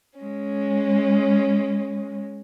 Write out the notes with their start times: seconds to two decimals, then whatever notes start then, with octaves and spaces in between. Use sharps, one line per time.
0.19 G#3 C#4